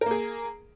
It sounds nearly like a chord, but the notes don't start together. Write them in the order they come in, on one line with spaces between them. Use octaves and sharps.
A#4 A#3 G#4